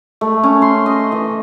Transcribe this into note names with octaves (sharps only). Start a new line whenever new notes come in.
A3
C#4
C6
D#5
E3